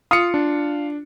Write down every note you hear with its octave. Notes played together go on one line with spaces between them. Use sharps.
F4 D#6 C#7
D4